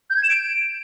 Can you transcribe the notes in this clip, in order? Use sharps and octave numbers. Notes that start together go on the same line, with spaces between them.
G6
G#6
E7
D7